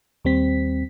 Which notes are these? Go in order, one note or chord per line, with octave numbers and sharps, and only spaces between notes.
D#2 G3 C4 B6